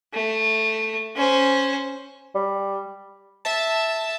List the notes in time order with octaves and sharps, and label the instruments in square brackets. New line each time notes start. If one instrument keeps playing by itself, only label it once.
[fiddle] A3
C#4 C5
[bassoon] G3
[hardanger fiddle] E5 [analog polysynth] A5